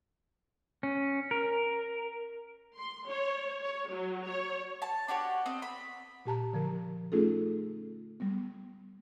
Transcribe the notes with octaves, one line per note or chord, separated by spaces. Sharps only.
C#4
A#4
C6
C#5
C#5
F#3
C#5
A5
D4 F#4 G4 C#5
C4 D#5
B5
A#2 G4 A5 A#5
D3 F3 A#4
A3 C#4 D#4 F4 G#4 A4
G3 B3